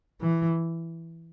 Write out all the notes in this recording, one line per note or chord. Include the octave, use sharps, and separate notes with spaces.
E3